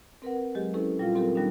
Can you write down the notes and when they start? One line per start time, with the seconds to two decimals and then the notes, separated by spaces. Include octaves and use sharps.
0.22 C4 A#4 B4 F#5
0.55 F#3 G#3 G4 G#4 D#5
0.74 C#4 E4 A4 B4
0.98 A#2 G3 F4 F5
1.14 F#3 C4 G4 A4 A#4
1.35 D#3 G3 G#3 B3 D4 D#4